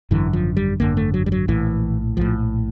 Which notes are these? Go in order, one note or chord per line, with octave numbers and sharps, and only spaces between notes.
G#1 F#2 D3 E3
F3
G3
G#1 F#2 D3 A#3
A3
F#3
G3
F#3
A#1 A2 E3
A#1 A2 F3